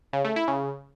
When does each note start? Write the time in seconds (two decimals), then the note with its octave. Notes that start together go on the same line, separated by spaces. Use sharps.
0.13 C#3
0.25 A3
0.36 E4
0.48 C#3